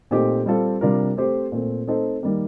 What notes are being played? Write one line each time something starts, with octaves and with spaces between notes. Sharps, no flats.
A#2 A3 C4 D#4 G4
G3 C4 F4 A4
C3 G3 D4 F4 A#4
A3 C4 G4 C5
A#2 A3 C4
A3 C4 D#4 A4 C5
D#3 G3 A#3